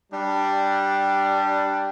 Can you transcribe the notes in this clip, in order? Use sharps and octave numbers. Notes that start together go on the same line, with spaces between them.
G3 D4